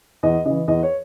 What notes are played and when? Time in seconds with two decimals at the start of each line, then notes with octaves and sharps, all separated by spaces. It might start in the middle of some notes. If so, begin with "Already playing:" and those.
0.23 E2 D#5
0.45 C#3 E3 D#5
0.68 E2 D#5
0.83 C#5